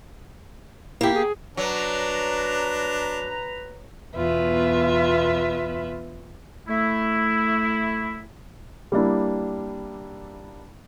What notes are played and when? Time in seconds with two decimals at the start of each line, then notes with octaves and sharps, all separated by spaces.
1.01 A#3 E4 G4
1.15 G#4
1.57 F#3 D4 B4 A#5
4.15 E2 B2 F4 B4 E5
6.69 A3 E4
8.92 G3 A#3 D4 E4